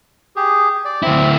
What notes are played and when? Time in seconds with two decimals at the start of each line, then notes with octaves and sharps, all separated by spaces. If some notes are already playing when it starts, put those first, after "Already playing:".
0.36 G4 G#4
0.85 D5
1.03 D2 C4 E4